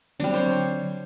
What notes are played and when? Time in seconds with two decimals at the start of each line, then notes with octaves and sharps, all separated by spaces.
0.20 D3 F#3 G3 C4 D4
0.34 C5 C#5